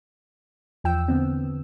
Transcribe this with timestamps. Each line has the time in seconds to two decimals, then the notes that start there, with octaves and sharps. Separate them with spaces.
0.84 E2 F3 G5 E6
1.08 D3 B3 C4